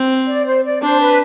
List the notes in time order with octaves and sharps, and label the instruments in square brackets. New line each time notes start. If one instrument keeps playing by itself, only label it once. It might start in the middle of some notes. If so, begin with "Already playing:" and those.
Already playing: [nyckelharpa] C4
[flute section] D5
C5
D5
[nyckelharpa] D4 [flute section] C5
[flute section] B4